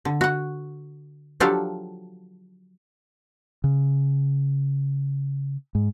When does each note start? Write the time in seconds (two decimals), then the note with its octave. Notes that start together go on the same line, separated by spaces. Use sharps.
0.05 D3
0.21 F#4 F#5
1.40 F3 F#3 D4 G4 A4 F5
3.64 C#3
5.75 G#2